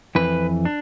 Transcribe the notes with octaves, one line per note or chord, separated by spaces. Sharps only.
F2 E3 B4
D4